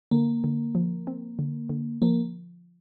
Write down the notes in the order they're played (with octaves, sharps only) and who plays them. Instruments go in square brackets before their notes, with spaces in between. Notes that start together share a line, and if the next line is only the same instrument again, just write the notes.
[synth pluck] D3 [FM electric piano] A#3
[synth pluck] D3
F3
C4
D3
D3
[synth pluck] F3 [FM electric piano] A#3